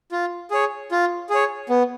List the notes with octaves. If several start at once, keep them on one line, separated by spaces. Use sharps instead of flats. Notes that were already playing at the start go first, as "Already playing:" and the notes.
F4
G#4 C#5
F4
G#4
C#5
B3